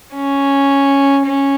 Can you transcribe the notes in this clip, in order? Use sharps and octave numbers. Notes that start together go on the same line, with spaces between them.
C#4
C#4